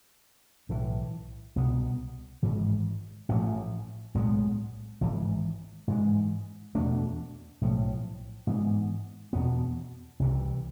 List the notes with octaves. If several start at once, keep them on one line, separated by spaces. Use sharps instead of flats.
B1 A2 E3
C2 B2 B3
G#1 G#2 E3
A1 A2 F3 A3
B1 A2 G#3 B3
G#1 G#2 E3
G#2 E3 G#3
E2 B2 A3 D4
B1 A2 F3
G#2 E3 B3
E2 B2 B3
C2 C3 E3